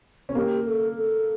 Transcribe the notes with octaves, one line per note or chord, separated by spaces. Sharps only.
C#4
A#3 G4
A4
A4